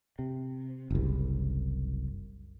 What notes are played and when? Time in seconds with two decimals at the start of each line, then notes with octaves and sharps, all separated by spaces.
0.19 C3
0.91 F#1 C2